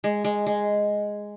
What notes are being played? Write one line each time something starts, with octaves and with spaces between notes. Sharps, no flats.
G#3
G#3
G#3